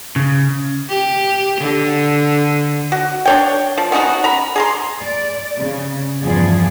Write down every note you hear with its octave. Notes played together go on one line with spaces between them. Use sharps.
C#3
G4
D3
F#4
D4 C#5 G5
F3
B3 C#4 D#4 F#4
A#5 B5
G#4 A#5 C6
D5
C#3
E2 G2 F3 G#4 D5